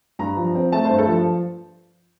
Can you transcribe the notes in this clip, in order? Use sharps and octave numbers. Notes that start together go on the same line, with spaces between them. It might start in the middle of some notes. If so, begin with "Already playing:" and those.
G2 A#5
F3
C4
A3 A5
G2 C5
A4
F3